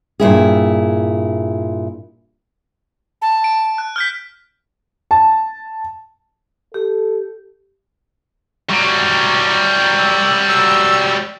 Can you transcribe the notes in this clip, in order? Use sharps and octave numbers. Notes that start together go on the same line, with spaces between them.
G2 A#2 E4 G#4
A5
D7
F#6
F6 G6 B6
A5
G4 A4
F#3 G3
E6
E6